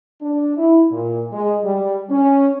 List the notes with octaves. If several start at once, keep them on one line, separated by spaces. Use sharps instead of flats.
D4
E4
A#2
G#3
G3
C#4